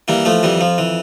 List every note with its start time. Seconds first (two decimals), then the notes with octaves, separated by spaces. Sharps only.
0.08 E3 G3 A#3
0.25 F3 A3
0.43 F2 E3 G3
0.61 F3
0.78 E3